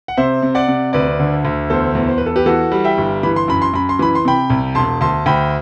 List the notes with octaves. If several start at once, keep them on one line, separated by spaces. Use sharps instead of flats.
F#5
C3 C5 E5
C3
D5 F#5
C3
D2 B4 D5
D3
D2
E2 A4 C5
E2
C5
E2 B4
A4
G4 B4
E3 F#4 A4
G3
E5 G5
G1
E3 B5
C6
F#2 B5
C6
F#2 B5
C6
E3 B5
C6
C3 G5 B5
C2
E1 A5 C6
D2 A5 C6
D2 G5 B5